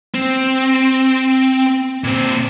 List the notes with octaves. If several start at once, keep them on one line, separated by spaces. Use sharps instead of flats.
C4
A#2 C4